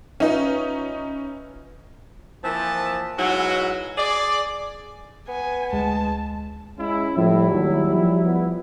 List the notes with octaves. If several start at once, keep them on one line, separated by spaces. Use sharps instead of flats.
C#4 D#4 F4 B4 E5
E3 F3 A#3 C4 A5
G#2 B2 F#3 E4 F#4
G#4 D5
B3 G#5
D2 G#3 A5
G#3 C#4 E4
A2 F3 G3 E4
D#2 F#3
F3
B3